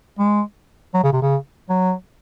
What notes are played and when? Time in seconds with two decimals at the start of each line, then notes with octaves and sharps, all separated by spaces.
0.19 G#3
0.94 F#3
1.03 C#3
1.12 C3
1.22 C#3
1.69 F#3